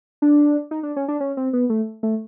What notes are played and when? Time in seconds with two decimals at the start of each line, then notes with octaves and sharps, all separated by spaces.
0.22 D4
0.71 D#4
0.83 D4
0.96 C#4
1.08 D4
1.20 C#4
1.37 C4
1.53 B3
1.70 A3
2.03 A3